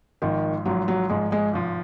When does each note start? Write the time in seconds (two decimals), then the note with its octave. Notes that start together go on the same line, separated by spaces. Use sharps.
0.22 G#1 G#2 D#3 F3
0.65 G#1 G#2 F3 F#3
0.88 F#3
1.09 G#1 G#2 F3 G#3
1.32 G#3
1.54 G#1 G#2 F3